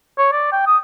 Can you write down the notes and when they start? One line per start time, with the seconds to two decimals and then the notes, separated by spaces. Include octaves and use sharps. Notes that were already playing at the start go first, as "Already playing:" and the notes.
0.18 C#5
0.32 D5
0.52 G5
0.67 D#6